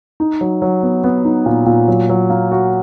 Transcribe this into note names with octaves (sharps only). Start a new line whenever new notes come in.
D#4
F#3
F#3
B3
B3
D#4
A#2
A#2
F#3
F#3
A#3
F#4